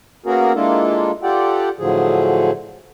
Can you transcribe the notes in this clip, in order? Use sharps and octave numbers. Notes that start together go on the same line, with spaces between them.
A#3 B3 C#4 F#4 G#4 A#4
G#3 A#3 D4 E4 F4 A4
F4 G4 A4 D5 F#5 G5
A2 D3 F3 F#3 G#4